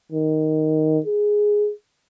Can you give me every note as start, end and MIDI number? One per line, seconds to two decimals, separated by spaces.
0.12 0.99 51
1.06 1.71 68